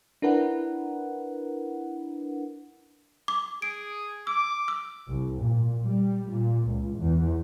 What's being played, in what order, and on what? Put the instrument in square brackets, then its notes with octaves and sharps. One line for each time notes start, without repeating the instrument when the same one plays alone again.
[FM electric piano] D4 E4 A#4 B4 F#5
[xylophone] D6
[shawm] G#4 [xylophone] D7
[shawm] D6 [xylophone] E6
[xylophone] E6
[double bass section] C2
A#2
G3
A#2
C#2
E2